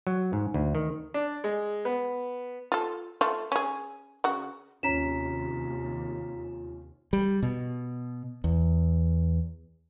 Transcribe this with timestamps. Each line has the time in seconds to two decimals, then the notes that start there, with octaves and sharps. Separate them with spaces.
0.07 F#3
0.33 G#2
0.54 D2
0.75 D#3
1.14 D4
1.44 G#3
1.85 B3
2.72 F4 A4
3.21 A3 F4
3.52 C#4 G#4
4.24 C#3 F#4
4.83 D#2 C3 C#4 F4 A#5 B6 E7
7.13 G3
7.42 B2
8.44 E2